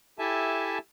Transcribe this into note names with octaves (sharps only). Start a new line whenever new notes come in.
E4 G4 A4 E5 G#5 A5